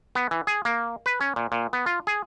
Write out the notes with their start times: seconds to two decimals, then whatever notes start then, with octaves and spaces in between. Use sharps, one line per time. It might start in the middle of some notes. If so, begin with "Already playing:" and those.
0.15 B3
0.31 E3
0.47 G#4
0.65 A#3
1.06 B4
1.21 C#4
1.36 A#2
1.52 A#2
1.73 B3
1.86 F4
2.07 G#4